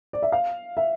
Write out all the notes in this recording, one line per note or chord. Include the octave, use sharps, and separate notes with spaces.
D5
E5
F5
E5